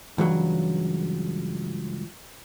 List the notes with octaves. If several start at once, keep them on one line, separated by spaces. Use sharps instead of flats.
C#2 G2 E3 F#3